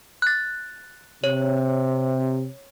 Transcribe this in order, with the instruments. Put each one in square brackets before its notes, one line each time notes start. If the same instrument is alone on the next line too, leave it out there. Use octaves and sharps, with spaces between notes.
[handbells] F#6 A6
[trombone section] C3 [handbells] C#5